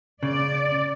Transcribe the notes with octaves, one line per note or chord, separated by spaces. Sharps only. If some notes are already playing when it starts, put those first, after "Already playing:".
C#3 D5